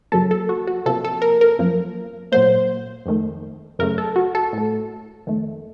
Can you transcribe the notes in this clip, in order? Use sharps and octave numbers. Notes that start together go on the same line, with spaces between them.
F#2 C#3 F#3 A#3 A4
A4
F#4
F#4
C3 F3 A#3 A4
A4
A#4
A#4
F#2 F3 A#3
A#2 F#3 A#3 C5
F2 D#3 A3
F#2 C#3 A3 A#4
A4
F#4
A4
A2 A3
F2 D#3 A3